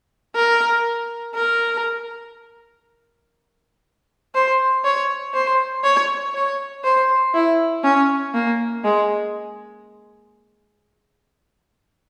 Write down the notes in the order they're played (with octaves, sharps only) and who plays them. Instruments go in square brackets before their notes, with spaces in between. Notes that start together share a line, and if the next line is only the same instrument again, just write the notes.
[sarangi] A#4
A#4
C5
C#5
C5
C#5
C#5
C5
E4
C#4
A#3
G#3